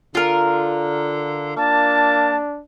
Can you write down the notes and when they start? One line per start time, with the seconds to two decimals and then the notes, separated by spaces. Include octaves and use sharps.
0.15 D3 F4 A#4
1.56 A#3 D4 A5